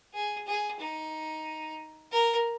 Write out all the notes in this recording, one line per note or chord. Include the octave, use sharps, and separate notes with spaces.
G#4
G#4
D#4
A#4